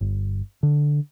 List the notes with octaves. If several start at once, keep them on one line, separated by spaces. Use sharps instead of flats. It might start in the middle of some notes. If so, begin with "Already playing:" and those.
G1
D3